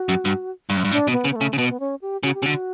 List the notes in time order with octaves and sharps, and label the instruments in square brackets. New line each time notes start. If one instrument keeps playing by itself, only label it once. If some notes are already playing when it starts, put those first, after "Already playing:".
Already playing: [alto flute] F#4
[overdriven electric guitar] F#2
G2
G2
F#2
G2
[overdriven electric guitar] A2 [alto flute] D4
[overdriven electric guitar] B2
[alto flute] B3
[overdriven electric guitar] C#3
[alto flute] B3
A3
[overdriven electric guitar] C#3
C#3
[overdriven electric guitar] B2 [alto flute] B3
[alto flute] B3
C#4
G4
[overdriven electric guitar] C#3 [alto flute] F#4
[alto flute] G4
[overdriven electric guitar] C#3
[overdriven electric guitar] D3 [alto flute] F#4